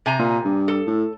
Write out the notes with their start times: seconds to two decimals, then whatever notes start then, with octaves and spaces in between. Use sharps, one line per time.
0.06 C3 G#5 A#5
0.19 A#2
0.45 G2
0.68 A4
0.87 A2